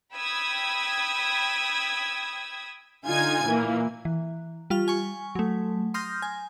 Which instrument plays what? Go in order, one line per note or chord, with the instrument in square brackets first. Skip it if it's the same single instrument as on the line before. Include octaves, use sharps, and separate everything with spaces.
[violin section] G5 B5 D#6 E6 G#6
[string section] D3 D#4 F4 G#5 G#6
A#2 E3 A#3
[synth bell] E3
G3 F4 F6
G#5 C#6
F#3 A3
C6 D#6 F6 G6 A#6
G#5